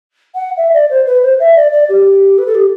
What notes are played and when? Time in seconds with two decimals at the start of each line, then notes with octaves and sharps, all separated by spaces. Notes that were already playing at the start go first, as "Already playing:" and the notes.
0.35 F#5
0.57 E5
0.74 D5
0.90 C5
1.06 B4
1.23 C5
1.40 E5
1.56 D5
1.72 D5
1.89 G4
2.38 B4
2.46 A4
2.54 G4